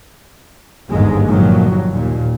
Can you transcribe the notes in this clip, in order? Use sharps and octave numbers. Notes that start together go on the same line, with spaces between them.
G1 D#2 G#2 G#3
G1 A#2 D#3 F3 F#3
D#2 A#2